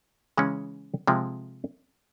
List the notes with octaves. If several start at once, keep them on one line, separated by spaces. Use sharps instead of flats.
C#3 E3 G#3 C#4
C3 F3 G#3